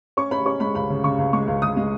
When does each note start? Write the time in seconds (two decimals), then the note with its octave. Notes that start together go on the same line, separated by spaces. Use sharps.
0.17 C#4 C#6
0.31 C#4 B5
0.46 C#4 C#6
0.60 G#3 B5
0.75 C#2 B5
0.90 C#3
1.04 C#3 C#6
1.18 C#2
1.33 G#3 C#6
1.47 C#2
1.62 C#2 D#6
1.77 G#3